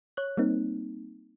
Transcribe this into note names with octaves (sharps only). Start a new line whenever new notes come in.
C#5 F#6
G3 A#3 C4 D#4